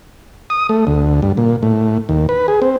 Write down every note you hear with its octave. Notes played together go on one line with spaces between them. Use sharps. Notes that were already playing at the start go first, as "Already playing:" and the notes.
D#6
A3
D2
G2
A#2
A2
D#2
B4
G#4
C4